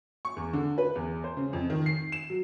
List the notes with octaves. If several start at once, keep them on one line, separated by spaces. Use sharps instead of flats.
C#6
E2
D3
B4
E2
C5
C#3
F2
D#3
C7
E7
F#3